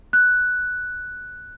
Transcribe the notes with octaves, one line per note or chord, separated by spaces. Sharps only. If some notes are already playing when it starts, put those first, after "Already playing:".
F#6